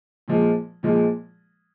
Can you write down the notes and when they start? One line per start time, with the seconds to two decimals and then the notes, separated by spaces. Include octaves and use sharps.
0.28 A#2 F3 G#3
0.83 A#2 F3 G#3